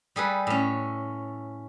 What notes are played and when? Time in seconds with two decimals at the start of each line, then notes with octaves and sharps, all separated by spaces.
0.16 G3 G#4 A4 B4
0.47 A2 C#4